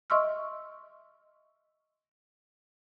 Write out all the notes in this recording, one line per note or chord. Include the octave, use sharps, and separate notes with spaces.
D#5 E5 C6 C#6 E6 F6